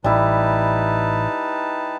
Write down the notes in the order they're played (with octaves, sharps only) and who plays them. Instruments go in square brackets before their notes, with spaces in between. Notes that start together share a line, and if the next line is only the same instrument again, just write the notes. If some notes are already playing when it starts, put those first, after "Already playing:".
[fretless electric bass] A1 [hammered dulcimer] G3 E4 [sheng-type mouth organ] D#4 B4 A5